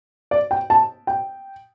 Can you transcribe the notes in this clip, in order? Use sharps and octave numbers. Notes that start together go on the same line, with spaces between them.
D5
G5
A5
G5